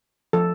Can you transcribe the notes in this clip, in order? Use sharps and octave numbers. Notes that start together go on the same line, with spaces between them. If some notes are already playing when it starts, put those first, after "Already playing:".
F3 A4